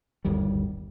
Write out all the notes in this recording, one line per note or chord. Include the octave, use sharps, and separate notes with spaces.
D1 G1 D#2 G3